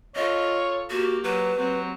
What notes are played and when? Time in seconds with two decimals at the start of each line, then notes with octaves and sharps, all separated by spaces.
0.16 F4 A4 C#5 D#5
0.90 A#3 F#4 G4
1.24 F#3 B4
1.57 F#3 C4